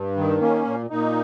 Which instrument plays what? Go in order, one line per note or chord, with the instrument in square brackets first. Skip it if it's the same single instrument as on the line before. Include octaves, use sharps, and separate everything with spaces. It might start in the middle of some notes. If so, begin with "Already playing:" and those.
Already playing: [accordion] G2
D#3
A#3 C#4
A#2
A#2 D#4